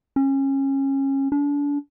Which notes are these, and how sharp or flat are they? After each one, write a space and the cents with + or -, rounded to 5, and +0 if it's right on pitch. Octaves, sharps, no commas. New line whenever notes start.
C#4 -25
D4 -35